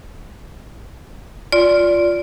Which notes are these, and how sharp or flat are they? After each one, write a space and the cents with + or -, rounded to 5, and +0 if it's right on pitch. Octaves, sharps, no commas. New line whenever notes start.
F4 +0 D5 -15 C6 +0